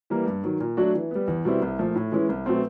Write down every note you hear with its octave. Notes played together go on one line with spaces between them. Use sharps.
E3 G3 A#3
G2
D#3 F#3
A#2
F#3 A3 D4 F#4
E3
G3 B3
E2
B2 G3 C4 E4
C2
A#2 F3 A3
A2
E3 G#3 C#4 E4
C2
B2 F#3 A3 C4